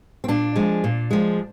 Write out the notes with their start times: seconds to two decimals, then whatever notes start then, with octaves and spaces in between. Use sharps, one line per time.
0.24 C4
0.28 A#2 D4
0.56 F3 G#3
0.84 A#2
1.11 F3 G#3